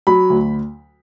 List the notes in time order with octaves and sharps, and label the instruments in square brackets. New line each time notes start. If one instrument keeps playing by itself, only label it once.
[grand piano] F#3 B5
D2